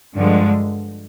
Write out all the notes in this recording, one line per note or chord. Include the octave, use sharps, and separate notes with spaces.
G2 D3 F3 G#3